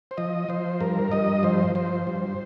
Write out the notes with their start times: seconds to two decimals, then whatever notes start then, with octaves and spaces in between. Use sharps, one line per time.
0.11 C5
0.17 F3 D#5
0.49 F3 C5
0.81 G2 A#4
1.12 G2 D#5
1.43 F3 C5
1.75 F3 C5
2.07 G2